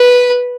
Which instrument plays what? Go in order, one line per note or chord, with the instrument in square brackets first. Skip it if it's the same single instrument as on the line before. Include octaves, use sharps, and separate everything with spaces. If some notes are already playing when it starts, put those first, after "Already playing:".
Already playing: [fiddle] B4